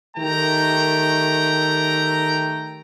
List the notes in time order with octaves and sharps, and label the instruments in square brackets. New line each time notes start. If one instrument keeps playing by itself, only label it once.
[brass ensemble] D#3 A3 G4 G5 A#5